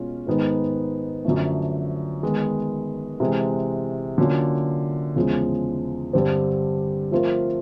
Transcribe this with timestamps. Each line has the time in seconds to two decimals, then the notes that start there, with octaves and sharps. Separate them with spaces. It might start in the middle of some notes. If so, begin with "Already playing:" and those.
Already playing: B2 G#3 C#4 F4
0.27 G#2 D#3 G#3 B3 D#4
1.25 F#2 D3 F3 A3
2.23 D#3 G#3 B3
3.20 C3 E3 G#3
4.18 D3 F#3 A#3 C#4 F4
5.16 E2 C#3 F3 G#3
6.13 G2 D3 G3 C4
7.11 F3 A3 C4 F4 A#4